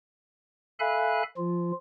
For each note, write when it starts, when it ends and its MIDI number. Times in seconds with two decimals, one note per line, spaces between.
0.80 1.23 69
0.80 1.23 76
0.80 1.23 77
0.80 1.23 80
0.80 1.23 83
0.80 1.23 90
1.37 1.72 53
1.37 1.72 65